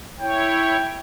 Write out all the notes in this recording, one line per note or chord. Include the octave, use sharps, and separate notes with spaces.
E4 C#5 G5